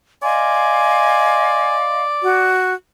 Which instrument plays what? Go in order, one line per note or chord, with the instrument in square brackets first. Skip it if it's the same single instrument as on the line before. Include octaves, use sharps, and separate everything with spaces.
[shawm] D5 [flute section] D#5 F5 C6 [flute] G#5
[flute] F#4